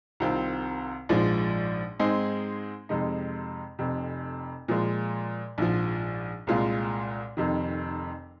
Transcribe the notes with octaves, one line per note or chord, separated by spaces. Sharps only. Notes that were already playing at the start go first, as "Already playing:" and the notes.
C2 C3 D#3 C4 F4
A#1 G#2 F3 G#3
G#2 G#3 C4 D#4 G#4
F2 C3 G#3 D#4
F1 F2 C3
A#2 F3 G#3
A#1 G#2 F3
C2 A#2 G#3 F4
F1 F2 C3 D#3